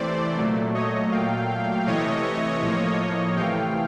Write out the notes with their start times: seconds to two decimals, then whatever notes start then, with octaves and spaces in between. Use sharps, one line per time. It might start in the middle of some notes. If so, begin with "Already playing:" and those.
Already playing: C3 E3 A3 C5 D5
0.37 A#2 F#3 A3
0.75 C#5 D#5
1.12 A#2 F#3 A3 F5 G5
1.87 C3 E3 A3 C#5 D#5
2.62 A2 F3 A#3
3.36 C3 E3 A3 F5 G5